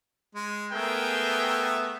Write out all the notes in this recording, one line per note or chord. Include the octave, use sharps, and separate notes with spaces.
G#3
A3 B3 G#4 A#4 E5 G5